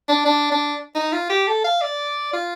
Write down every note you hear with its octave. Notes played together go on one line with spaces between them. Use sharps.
D4
D4
D4
D#4
F4
G4
A4
F5
D5
F4